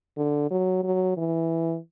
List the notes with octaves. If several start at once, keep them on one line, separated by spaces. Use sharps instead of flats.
D3
F#3
F#3
E3